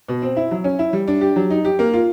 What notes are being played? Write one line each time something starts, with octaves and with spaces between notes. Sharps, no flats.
B2
C4
E4
F#3
C#4
E4
G3
D4
G4
F#3
D#4
G4
A#3
F4